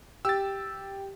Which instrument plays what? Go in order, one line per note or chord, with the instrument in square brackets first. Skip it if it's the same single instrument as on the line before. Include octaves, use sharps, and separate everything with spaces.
[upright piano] G4 [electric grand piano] E6 A6